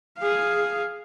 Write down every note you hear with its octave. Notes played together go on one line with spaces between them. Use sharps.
G#4 F5